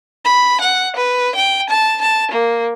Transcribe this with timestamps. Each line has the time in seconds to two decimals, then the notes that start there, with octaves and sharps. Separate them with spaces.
0.25 B5
0.61 F#5
0.96 B4
1.35 G5
1.70 A5
2.02 A5
2.31 A#3